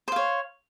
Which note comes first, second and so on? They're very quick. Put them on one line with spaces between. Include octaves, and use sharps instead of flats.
C5 F5 C#5